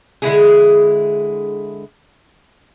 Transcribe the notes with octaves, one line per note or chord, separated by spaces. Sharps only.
D3 G#3 E4 G#4